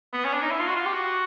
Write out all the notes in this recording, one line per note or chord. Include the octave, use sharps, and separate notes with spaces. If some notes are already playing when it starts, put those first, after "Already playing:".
B3
C#4
D4
D#4
E4
F4
F#4
F4
G4
F#4